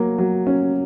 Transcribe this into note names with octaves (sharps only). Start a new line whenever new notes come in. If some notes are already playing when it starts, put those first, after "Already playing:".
Already playing: F#3 A#3
F#3
C#4